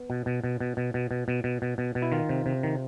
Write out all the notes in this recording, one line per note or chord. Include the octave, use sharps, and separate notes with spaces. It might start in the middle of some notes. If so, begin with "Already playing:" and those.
Already playing: B3
B2
B2
B2
B2
B2
B2
B2
B2
B2
B2
B2
B2
E4
D#3 F4
C3
C3
D#3